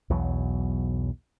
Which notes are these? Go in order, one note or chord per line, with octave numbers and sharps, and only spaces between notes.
B1 E2 B2 F#3